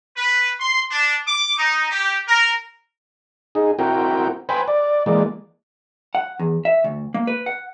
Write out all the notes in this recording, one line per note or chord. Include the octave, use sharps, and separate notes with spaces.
B4
C6
D4
D6
D#4
G4
A#4
D#4 G#4
C4 E4 F#4 A#4 G5
B4 C5 G5 G#5 B5
D5
E3 G#3 A#3 D5
F#5
E2
E5
D2
A#3
B4
F#5